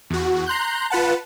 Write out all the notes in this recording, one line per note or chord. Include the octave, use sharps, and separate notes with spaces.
E2 F#4
A#5 C6 F#6 G6
F4 B4 F#5 A5